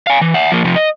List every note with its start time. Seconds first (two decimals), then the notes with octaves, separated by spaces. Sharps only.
0.07 F5 G#5
0.21 E3
0.34 E5 F#5
0.51 F3 A#3
0.64 C3 F3
0.76 D#5